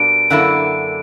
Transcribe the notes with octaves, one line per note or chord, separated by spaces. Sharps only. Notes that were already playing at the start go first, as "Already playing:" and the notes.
Already playing: B2 G3 A#3 D4 D7
F#2 D3 A#3 E4